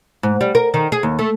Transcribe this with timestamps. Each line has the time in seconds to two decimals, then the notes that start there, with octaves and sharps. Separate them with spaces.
0.23 G#2
0.41 G3
0.55 A#4
0.74 D#3
0.92 G#4
1.03 D#2
1.19 A3